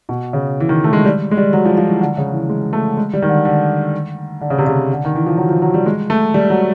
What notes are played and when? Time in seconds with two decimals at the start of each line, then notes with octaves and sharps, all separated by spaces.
0.09 B2
0.33 C#3
0.60 E3
0.69 D#3
0.84 A3
0.93 G#3
1.05 G3
1.31 G#3
1.37 G3
1.53 F#3
1.65 F3
1.78 F3
1.89 E3
2.01 D3
2.17 C#3
2.33 E3
2.49 G#3
2.73 A3
2.97 G#3
3.13 G3
3.22 D#3
3.29 D3
3.45 D3
4.41 D3
4.50 C#3
4.58 C3
4.67 C#3
4.93 D3
5.05 D#3
5.15 E3
5.26 F3
5.37 F#3
5.49 F3
5.62 F#3
5.74 G3
5.86 G#3
6.10 A3
6.34 G3
6.50 F#3